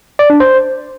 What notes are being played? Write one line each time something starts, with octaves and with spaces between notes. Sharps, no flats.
D5
D4
C5